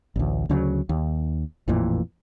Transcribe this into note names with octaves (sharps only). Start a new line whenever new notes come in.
A1 D2
D2 C#3 F3 F#3
D#2
A1 F2 A#2 E3